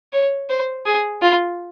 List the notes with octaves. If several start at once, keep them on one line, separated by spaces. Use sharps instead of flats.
C#5
C5
G#4
F4